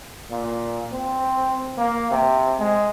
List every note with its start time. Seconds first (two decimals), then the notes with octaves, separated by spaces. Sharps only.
0.31 A#2
0.92 C4
1.78 A#3
2.11 C3
2.59 G#3